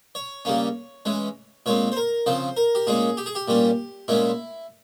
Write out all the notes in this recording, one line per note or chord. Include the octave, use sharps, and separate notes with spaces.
C#5
C#3 G3 A#3 C#4
E3 G#3 C#4
A#2 G#3 C4 C#5
C5
A#4
C#3 F3 C4 C5
A#4
G4
A#2 G#3 C#4 G#4
G4
G#4
G4
A#2 G3 C#4
A#2 G#3 C#4 E4